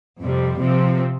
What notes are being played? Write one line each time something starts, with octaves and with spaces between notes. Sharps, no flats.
F2 C3 G3
C3 F3 C4